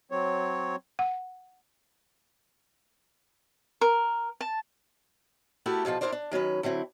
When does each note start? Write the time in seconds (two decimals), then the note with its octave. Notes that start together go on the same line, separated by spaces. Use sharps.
0.11 F#3 C4 C#5
0.99 F#5
3.81 A#4
4.41 A5
5.66 A3 E4 F#4 G4 A4 A#4
5.85 E2 B2 F3 F4 A5
6.01 D4 E4 F#4 A#4 C5 D5
6.12 D4
6.31 D#3 F#3 C#4 B4
6.63 D3 F#3 C4 E4